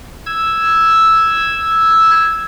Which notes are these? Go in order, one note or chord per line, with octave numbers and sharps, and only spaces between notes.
E6 G#6